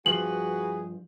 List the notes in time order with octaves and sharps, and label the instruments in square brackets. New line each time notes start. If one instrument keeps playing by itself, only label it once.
[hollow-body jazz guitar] G2 F3 [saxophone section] F#4 B4 [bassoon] G#4 [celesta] F#7